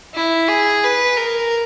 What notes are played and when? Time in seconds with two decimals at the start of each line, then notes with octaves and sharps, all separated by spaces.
0.14 E4
0.48 G#4
0.84 B4
1.17 A#4